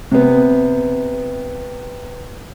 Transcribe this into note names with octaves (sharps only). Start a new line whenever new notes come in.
C3 B3